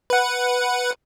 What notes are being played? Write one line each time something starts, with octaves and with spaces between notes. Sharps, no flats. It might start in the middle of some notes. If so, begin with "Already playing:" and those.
B4 F#5